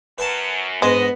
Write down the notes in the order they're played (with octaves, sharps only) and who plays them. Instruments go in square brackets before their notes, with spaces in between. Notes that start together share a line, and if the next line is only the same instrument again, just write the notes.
[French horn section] F#2 [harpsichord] B4 A5
[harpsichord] G#2 D4 [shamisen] G#3 [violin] B3 [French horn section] D#5